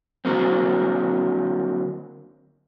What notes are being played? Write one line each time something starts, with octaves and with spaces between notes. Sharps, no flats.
D3 F#3 A#3 C4